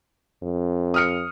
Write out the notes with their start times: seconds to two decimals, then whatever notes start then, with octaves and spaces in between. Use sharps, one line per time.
0.43 F2
0.94 D#6 F6 C#7